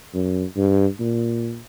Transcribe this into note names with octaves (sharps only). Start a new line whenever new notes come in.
F#2
G2
A#2